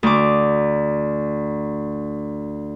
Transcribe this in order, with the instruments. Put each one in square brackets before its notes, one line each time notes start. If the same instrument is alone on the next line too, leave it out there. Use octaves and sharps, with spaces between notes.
[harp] D2 D6